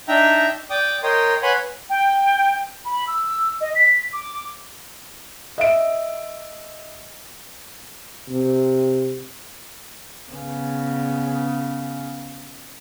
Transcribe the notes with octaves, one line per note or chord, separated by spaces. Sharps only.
D4 D#4 E5 G5 A#5
D5 G5 D6 D#6
A#4 C#5 D#5 G5 C6 D#6
B4 C#5 F#5 G#5 B5 C6
G5
B5
E6
D#5
B6
D6
D#5 E5 D7
C3
C#3 B3